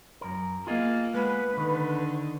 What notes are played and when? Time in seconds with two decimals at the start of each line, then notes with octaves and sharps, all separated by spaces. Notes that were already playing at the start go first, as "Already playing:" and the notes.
0.21 F#2 A#4
0.67 A#3 F4 G#4 D#5
1.14 G#3 B3 B4
1.57 D3 D#3